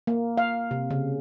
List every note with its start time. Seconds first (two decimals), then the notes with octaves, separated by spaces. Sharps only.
0.07 A#3
0.37 F5
0.71 C3
0.91 C#3